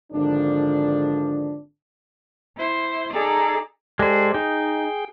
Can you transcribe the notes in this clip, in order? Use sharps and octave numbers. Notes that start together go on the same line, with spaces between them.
G#1 D3 F3 D4
E4 C5
D#4 G#4 A4 D5 A#5
G#3 G4 A4 C5 D5
D#4 G#4 G5